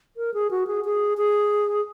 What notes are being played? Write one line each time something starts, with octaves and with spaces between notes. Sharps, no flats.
A#4
G#4
F#4
G#4
G#4
G#4